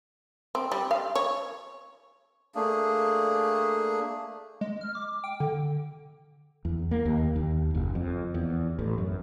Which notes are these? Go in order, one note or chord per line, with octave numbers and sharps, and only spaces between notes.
C4
G3
F5
C#5
A3 A#3 D4 G#4
G#3
F6
D6
G5
D3
E2
A#3
D#2
D#2
F#1
F2
E2
A1
F#2